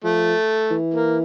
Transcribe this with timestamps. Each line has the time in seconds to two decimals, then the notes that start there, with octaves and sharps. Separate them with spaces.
0.04 F3 A3
0.71 E3
0.94 A#3